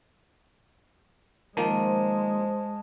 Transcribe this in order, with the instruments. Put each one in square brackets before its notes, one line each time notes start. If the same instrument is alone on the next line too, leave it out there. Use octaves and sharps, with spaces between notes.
[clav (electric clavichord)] D#3 F3 A#3 [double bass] G#3 [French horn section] C5 [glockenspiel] A5